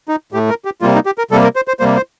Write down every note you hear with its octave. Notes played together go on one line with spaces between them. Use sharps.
D#4
A2 A3 G4
A#4
G4
C3 G3 A#3 F4
D#4
G4
A#4
C3 G3 A#3 A4
A#4
C5
C5
C3 G3 A#3 C5
C5